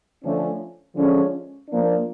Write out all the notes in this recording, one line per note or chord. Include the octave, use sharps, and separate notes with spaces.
D3 F3 A3 C#4
D3 F3 G#3 C#4
F3 A#3 D4